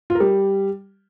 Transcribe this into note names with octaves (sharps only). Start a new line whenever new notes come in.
F4
A#4
G3